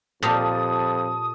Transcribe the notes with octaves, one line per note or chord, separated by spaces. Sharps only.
F2 A#2 G4 A4 C#5 F5 A5 D#6